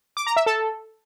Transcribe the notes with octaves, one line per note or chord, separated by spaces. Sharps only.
D6
A#5
E5
A4